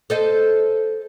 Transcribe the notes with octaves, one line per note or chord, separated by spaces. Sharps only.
A4 C5 D#5